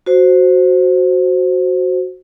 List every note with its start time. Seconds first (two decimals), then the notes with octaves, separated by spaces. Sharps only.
0.06 F#4 C5